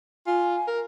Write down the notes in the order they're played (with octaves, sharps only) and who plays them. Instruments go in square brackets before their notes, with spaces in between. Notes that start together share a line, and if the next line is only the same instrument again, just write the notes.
[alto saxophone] F4 [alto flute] G#5
[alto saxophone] A#4